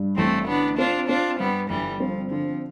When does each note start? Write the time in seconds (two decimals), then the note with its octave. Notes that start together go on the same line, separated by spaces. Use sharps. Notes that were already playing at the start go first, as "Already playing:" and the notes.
Already playing: G2
0.17 A1 A3 C4
0.48 D3 B3 D4
0.78 C4 D4 F4
1.09 C4 D4 F4
1.40 G2 G3 B3
1.70 G1 E3 G3
2.00 F3 C4
2.31 D3 F3